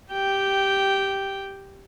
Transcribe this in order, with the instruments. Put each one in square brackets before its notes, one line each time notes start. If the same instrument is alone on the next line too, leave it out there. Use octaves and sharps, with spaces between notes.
[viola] G4 G5